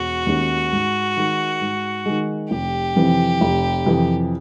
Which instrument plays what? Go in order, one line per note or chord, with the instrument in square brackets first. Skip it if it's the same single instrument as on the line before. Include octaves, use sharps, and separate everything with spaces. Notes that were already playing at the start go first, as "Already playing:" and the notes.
Already playing: [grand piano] E1 [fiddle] F#4
[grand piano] D#2 D#3 G#3 C#4
G#2
D#3 G#3
G#2
D#3 G#3
[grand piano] F1 [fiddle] G4
[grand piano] F2 C3 E3
F1
F2 C3 E3